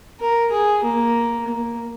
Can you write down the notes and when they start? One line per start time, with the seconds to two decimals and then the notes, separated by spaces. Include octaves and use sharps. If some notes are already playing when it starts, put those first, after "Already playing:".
0.20 A#4
0.51 G#4
0.83 A#3
1.47 A#3